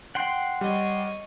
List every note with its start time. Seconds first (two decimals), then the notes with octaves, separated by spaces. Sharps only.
0.15 F#5 G5 C6
0.61 G3 C#5 D#5